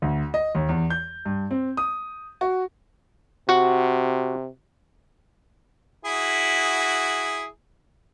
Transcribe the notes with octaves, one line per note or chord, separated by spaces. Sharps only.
D2
D#5
D#2
E2
G6
G2
C4
D#6
F#4
C3 F#4 F#5
E4 F#4 G#4